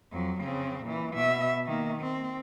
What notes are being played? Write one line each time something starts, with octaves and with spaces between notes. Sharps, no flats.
F2 F#3
C#3 C4
A#2 E3
B2 E5
D#3 A#3
C4